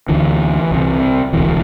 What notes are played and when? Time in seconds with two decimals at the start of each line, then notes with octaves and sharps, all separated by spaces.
0.09 D2 D3 E3
0.71 C2 C3
1.33 E1 D2 C3 E3